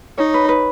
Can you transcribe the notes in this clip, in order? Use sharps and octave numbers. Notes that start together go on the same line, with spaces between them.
D#4 C#5
B4
B4